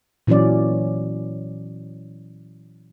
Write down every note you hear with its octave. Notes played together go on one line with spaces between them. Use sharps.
A#2 E3 F#3 C#4 D5